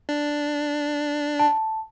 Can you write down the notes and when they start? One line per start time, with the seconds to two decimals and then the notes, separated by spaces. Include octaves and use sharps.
0.09 D4
1.39 A5